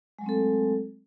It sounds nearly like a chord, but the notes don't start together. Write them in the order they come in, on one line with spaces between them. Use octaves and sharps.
G#3 F#3 A3 C4 A4